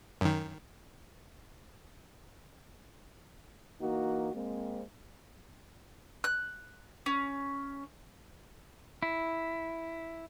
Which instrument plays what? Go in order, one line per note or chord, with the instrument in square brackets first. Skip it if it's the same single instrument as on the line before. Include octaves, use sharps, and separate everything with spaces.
[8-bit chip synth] F#2 D#3
[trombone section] E3 A#3 D#4 F#4
G#3 A#3 C4
[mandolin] F#6
C#4
[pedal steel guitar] E4